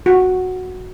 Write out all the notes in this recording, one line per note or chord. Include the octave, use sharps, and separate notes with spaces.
F#4